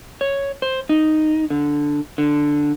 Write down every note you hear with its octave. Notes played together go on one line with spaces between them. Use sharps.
C#5
C5
D#4
D3
D3